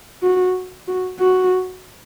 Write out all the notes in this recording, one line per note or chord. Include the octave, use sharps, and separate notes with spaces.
F#4
F#4
F#4